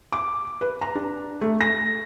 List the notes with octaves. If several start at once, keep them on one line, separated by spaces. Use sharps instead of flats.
D6
B4
A#5
D4
A3
A#6